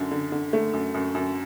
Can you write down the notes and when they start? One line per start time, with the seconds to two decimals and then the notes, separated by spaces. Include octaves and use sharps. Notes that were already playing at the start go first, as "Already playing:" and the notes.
Already playing: F#2 D3
0.11 D3
0.32 D3
0.53 A3
0.73 F#2
0.94 F#2
1.15 F#2